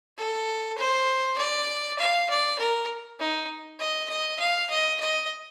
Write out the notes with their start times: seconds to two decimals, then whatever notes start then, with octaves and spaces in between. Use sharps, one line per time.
0.17 A4
0.78 C5
1.38 D5
1.99 F5
2.29 D5
2.59 A#4
3.19 D#4
3.79 D#5
4.10 D#5
4.40 F5
4.70 D#5
5.00 D#5